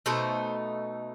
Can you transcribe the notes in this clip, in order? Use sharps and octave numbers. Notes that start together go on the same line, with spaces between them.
B2 A3 D#4 C5